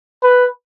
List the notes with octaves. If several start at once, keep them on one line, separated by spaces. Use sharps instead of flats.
B4